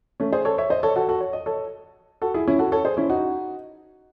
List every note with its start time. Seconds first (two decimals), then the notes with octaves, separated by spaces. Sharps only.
0.20 A3 C#4
0.32 G#4 C5
0.45 A4 C#5
0.58 C#5 E5
0.70 C5 D#5
0.83 A4 C#5
0.96 F#4 A4
1.09 F#4 A4
1.21 C#5
1.33 D#5
1.46 A4 C#5
2.22 F#4 A4
2.34 E4 G#4
2.47 C#4 E4
2.59 F#4 A4
2.72 A4 C#5
2.85 G#4 C5
2.97 C#4 E4
3.09 D#4 F#4